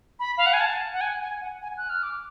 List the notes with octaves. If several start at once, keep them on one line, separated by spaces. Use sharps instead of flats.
B5
F5
F#5
G#5
A5
F#5
G#5
G#5
F#5
G#5
F#6
F6
D6